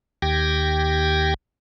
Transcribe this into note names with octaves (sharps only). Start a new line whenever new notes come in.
D#2 G4 G5 G#6 A#6